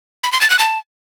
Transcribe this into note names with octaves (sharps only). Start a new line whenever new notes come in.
B5
C6
A6
F#6
A5